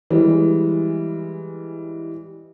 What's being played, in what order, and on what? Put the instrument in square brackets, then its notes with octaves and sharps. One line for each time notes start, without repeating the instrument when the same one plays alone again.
[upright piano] E3 G3 G#3